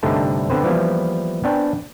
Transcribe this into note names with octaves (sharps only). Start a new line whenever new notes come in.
C2 G2 D3 A3 D#4 A5
D3 B3 C4 B4 C5
E3 F3 G3 A#3 B3
B3 C4 D4 G5 G#5